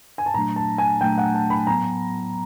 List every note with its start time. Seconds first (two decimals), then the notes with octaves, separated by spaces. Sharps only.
0.18 G#5
0.26 A5
0.34 A#2 F#3 A3 D4 A#5
0.56 A5
0.78 G#5
1.01 A#2 F#3 A3 D4 G5
1.18 F#5
1.35 A5
1.50 B5
1.67 A2 F#3 B3 A#5